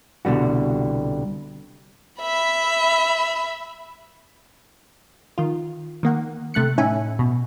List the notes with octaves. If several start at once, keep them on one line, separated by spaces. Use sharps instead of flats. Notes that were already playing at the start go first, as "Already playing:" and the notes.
C2 B2 D3 G3 F#4
E5 B5
D#3 F4
D#3 A#3 F#5
C3 A3 F#6 C#7
A2 C#4 D#4 E5 G#5
B2